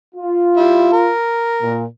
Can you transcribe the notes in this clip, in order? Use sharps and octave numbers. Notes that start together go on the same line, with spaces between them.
F4
G3 E4
A#4
A#2